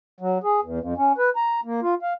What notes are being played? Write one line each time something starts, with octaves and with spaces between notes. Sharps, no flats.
F#3
G#4
E2
F2
C#4
B4
A#5
A#3
F4
F5